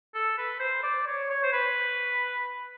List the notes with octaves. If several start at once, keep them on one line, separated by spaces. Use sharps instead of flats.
A4
B4
C5
D5
C#5
C#5
C5
B4